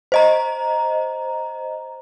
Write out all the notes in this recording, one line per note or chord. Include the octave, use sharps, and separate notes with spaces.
C5 D#5 A#5